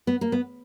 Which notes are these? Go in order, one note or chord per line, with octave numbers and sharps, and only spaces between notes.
B3
A#3
B3